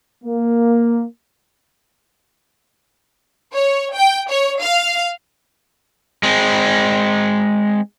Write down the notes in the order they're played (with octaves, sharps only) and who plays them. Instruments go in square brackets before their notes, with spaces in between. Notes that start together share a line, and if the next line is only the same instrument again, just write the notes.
[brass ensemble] A#3
[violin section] C#5
G5
C#5
F5
[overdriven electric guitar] G#3 C4